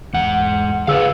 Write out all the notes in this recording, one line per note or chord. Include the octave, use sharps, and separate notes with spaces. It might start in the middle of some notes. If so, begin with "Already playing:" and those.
E2 G#2 F#5
D3 G#4 B4 C#5 F5 E6